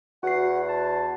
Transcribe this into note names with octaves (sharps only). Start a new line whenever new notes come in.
E2 F#4 F#5 C7
A5